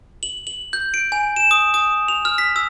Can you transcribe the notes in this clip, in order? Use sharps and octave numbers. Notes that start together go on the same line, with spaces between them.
F#7
F#7
G6
D7
G#5
E7
D#6
D#6
F7
F6
B6
E6